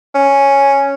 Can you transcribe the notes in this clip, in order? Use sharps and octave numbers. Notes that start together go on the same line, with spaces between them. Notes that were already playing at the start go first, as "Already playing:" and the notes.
C#4